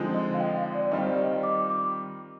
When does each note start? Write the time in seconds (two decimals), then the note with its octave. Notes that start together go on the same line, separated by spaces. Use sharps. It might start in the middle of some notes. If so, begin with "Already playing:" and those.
Already playing: D3 F3 G#3 C4 D#4
0.14 D#5
0.34 F5
0.40 G5
0.57 F5
0.75 D5
0.92 D#3 G3 C4 F4 D#5
1.06 D5
1.18 D#5
1.43 D6
1.70 D6